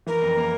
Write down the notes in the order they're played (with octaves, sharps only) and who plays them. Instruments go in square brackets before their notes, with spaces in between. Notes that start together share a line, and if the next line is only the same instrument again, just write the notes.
[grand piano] E3 [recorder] A#4
[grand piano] F2
A#3